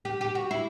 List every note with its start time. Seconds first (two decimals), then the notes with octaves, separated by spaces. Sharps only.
0.05 G4
0.21 G4
0.35 F#4
0.51 E4